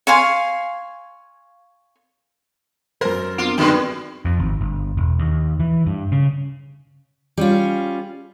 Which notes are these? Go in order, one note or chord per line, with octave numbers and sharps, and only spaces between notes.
C#5 F5 G#5 C6
F#2 A#4 C5
B3 C4 D4 F4
F#2 D3 G3 G#3 B4 G5 C6
F2
G#1
G1
E1
D#2
E3
G2
C#3
G3 C#4 F4